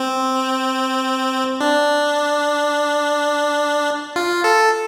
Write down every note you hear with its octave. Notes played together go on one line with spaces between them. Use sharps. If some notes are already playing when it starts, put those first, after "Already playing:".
Already playing: C4
D4
F4
A4